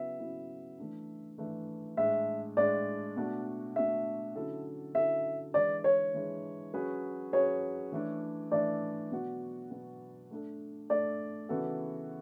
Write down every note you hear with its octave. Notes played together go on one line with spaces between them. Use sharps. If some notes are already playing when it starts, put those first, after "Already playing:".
Already playing: C#3 F#3 B3 E4 E5
C#3 F#3 B3 E4
E3 A3 D4
E3 A3 D4
A2 G#3 D4 E5
A2 G#3 D4 D5
B2 A3 D4 F#4
B2 A3 D4 F#4 E5
D3 F#3 C#4 E4 A4
D3 F#3 C#4 E4 A4 E5
E3 G#3 D4 D5
C#5
E3 G#3 D4
F#3 C#4 G#4 B4
F#3 C#4 G#4 B4 C#5
E3 A3 D4
E3 A3 D4 D5
B2 F#3 B3 F#4
B2 F#3 B3 F#4
A3 D4 A4
A3 D4 A4 D5
C#3 E3 B3 F#4 A4